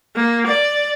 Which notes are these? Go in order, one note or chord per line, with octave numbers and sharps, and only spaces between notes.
A#3
D5